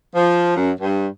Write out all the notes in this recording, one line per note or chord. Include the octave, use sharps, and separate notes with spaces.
F3
F#2
G2